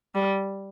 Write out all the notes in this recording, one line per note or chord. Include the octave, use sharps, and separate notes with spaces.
G3